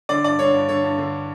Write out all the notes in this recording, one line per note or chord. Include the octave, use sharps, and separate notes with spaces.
D3 D5
G2 D5
D3 C#5
G2
D3 C#5
G2
D3